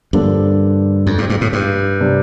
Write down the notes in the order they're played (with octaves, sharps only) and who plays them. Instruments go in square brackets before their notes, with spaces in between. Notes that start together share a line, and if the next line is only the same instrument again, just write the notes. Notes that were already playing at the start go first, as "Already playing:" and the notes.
[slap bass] G2 [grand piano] D3 F3 A#3 D4 A4
[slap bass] F2
G2
G2
A2
G2
[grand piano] C3 G3 D4